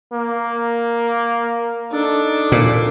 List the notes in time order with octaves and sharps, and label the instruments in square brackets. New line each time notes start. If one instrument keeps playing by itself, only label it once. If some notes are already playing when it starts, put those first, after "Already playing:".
[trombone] A#3
[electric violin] D4 A4 [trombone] D#4
[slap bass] A#2